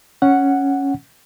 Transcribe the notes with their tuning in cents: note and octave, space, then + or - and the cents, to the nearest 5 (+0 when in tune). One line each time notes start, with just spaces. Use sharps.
C#4 +0 F#5 +0